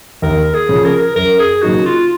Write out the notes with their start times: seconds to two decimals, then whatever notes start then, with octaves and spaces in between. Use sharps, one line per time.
0.22 D#2 A#4
0.54 G#4
0.69 C#3 F3
0.85 A#4
1.16 F#2 A#4
1.39 G#4
1.62 C#3 F#3 A#3 D#4 F#4
1.86 F4